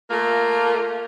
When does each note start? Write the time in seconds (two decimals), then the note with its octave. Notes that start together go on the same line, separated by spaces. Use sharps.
0.09 A3 A#3 F4 A#4